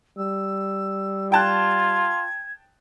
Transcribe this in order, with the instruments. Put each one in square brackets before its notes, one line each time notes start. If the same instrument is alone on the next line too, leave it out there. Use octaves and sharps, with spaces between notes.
[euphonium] G3 [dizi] E6
[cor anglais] F4 [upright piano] G5 A5 F#6 [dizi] G#6